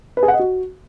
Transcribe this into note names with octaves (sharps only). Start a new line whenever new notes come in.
B4
G#4
F#5
D#5
F#4